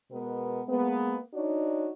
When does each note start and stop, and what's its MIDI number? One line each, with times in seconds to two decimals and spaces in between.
0.12 0.62 47
0.12 0.62 56
0.12 0.62 59
0.12 0.62 70
0.68 1.18 56
0.68 1.18 58
0.68 1.18 59
1.34 1.91 62
1.34 1.91 63
1.34 1.91 66
1.34 1.91 73